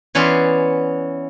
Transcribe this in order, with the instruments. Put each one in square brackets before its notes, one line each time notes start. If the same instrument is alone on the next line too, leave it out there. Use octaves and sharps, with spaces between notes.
[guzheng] E3 B3 C#4 D5 C6